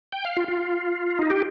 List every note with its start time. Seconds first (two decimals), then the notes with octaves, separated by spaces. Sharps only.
0.12 G5
0.25 F5
0.37 F4
0.48 F4
1.19 D#4
1.30 G4